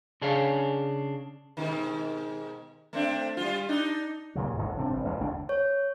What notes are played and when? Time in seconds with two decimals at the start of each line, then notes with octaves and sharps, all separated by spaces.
0.22 C#3 D4 G#4 C#5 F5
1.57 G#2 B2 D#3
2.93 A3 C4 D4
3.37 G3 F4
3.69 D4 D#4
4.35 D#2 A#2 C#3 F#3
4.58 A1 G#2 D3
4.76 G1 C3 C4 D4
4.93 A1
5.05 A1 E2 B2 G#3
5.20 F#1 D2 D4
5.49 C#5